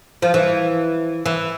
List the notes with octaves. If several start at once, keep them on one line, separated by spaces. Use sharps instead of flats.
F3
E3
E3